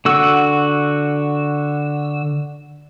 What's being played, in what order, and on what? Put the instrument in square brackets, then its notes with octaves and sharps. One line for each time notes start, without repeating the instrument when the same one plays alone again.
[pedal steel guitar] D3 F#4 E6